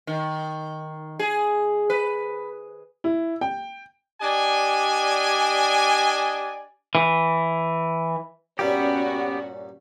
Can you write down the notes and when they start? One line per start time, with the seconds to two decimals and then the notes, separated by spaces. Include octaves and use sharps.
0.07 D#3
1.19 G#4
1.90 B4
3.04 E4
3.41 G5
4.21 D4 G4 D5 D#5 G#5
6.95 E3
8.59 G2 A#2 G3 B3 C#4 F#4 G4